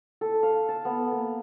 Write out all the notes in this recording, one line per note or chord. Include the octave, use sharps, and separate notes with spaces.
A4
F5
A5
B3
A#3